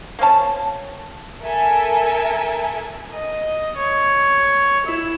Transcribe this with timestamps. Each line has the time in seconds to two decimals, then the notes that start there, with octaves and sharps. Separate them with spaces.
0.19 A#3 C4 C#4 A5
1.43 A4 A#4 E5 G#5
3.13 D#5
3.77 C#5
4.86 E4